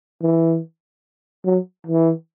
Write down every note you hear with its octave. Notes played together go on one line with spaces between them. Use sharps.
E3
F#3
E3